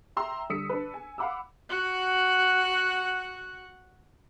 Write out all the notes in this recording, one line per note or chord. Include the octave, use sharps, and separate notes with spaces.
E5 G5 A#5 C6 E6
D3 G3 D#6 E6 B6 C#7
D4 B4
G#5
F5 F#5 B5 D6 E6
F#4 F#5